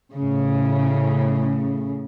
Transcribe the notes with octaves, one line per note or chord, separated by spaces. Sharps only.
A2 C#3